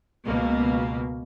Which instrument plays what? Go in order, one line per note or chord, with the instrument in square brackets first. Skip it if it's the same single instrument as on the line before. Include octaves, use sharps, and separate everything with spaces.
[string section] C#2 B2 A#3